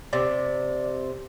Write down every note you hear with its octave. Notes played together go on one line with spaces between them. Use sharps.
C3 D5